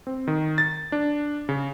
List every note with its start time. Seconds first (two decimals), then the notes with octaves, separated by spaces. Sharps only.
0.07 C4
0.27 D#3
0.58 A6
0.92 D4
1.49 C#3